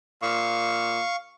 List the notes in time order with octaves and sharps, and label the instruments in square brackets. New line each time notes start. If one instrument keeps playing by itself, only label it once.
[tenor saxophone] A#2 [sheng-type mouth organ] F5 C#6